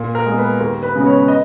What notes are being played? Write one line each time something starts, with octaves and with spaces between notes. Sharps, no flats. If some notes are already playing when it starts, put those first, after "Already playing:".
Already playing: A#2
A#4
G#3 B3
B4
D#2 A#4
B4
C#3 G#3 B3
C#5
D#5